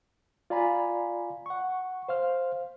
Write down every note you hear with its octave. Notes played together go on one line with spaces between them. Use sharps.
F4 D5 F5 G#5 A#5 B5
F#5 C#6
C5 F5 F6